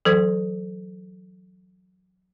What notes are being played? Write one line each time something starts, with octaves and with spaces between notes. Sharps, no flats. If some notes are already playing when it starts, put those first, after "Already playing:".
E3 F#3 A4